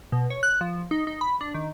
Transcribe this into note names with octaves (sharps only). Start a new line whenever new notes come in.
B2
C#5
F#6
F3
D#4
D#4
B5
D4
D#3